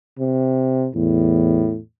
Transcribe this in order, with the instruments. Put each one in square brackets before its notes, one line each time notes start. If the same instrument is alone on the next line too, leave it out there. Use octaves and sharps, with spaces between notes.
[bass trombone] C3
[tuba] E2 [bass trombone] A2